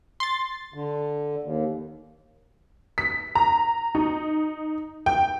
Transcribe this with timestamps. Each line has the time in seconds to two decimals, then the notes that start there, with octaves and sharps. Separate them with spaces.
0.20 C6 A6
0.74 D3
1.44 D#2
2.98 B6
3.35 A#5
3.95 D#4
5.06 G5